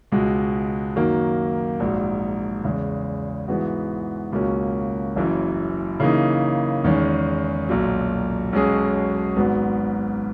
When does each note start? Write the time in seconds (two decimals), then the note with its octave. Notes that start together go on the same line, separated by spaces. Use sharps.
0.12 C#2 B2 G#3
0.96 F#2 D#3 F#3 A#3
1.80 A#1 G#2 F#3
2.64 E2 C#3 G#3
3.48 G#2 E3 G#3 B3 F#4
4.32 C#2 B2 F#3 A#3 C#4
5.16 F#1 F#2 E3
6.00 C#3 E3 A#3 D#4
6.84 E2 D#3 G#3 C#4
7.68 B1 A#2 F#3
8.52 B1 B2 G#3 C#4 G#4
9.36 G#1 G#2 F#3 B3